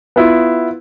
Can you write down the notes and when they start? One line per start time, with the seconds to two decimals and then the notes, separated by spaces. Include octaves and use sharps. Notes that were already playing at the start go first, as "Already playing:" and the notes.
0.16 B3 E4 F4